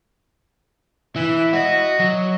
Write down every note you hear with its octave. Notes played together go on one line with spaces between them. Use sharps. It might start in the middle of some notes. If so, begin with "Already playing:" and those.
E3 E5
F#4 D#5
F#3